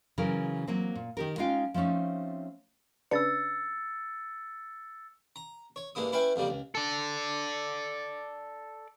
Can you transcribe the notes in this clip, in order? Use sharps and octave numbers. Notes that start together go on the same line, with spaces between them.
C#3 E3 F#3 A#4
F#3 A#3 C4
A#2
D#3 G4 A#4
G#3 C#4 D#4 F4 F5 G5
F3 A3 C4 C#4 D#4
C#3 D4 B4 E6 A6 C#7
A#5
C#5
G2 G#3 A#3 E4 D#6
C#4 E4 B4 F5 G5 G#5
F2 C#3 G3 A#3
C#2
A4 D5